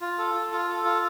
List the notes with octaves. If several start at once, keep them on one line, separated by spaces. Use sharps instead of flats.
F4
A4
F4
F4
A4
F4